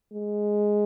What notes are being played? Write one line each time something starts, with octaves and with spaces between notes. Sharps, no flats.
G#3